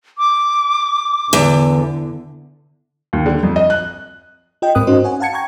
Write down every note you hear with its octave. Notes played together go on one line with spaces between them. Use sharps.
D6
E2 D3
D#2
D3
F2
D#5
F#6
F4 D#5 G5
G#2 C4 A#4 D#6 F#6
C#4 D#4 F#4 C5 D#5
C#5 F#5 G#5
F5 F#5 A5 G#6 C#7
G5 A#5 C#6 G#6